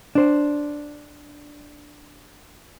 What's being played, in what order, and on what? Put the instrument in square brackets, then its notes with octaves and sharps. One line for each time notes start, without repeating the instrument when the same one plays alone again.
[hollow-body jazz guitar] D4 C5